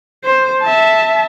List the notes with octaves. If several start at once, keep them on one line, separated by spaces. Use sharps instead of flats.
C5
E5 A5